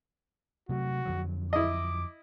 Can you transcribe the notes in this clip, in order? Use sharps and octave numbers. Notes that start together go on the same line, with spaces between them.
C3 F#3 A3 F#4
F2 D3 F#3
E4 D#5 D6